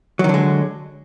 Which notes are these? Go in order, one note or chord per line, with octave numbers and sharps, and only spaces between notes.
D3 D#3 F#3 G#3